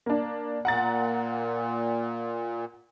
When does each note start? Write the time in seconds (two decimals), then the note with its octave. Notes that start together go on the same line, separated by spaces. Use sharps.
0.06 A#3 D4
0.65 A#2 F#5 A#5 A6